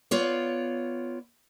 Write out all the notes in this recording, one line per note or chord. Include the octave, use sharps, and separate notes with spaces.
B3 F4 C#5 D5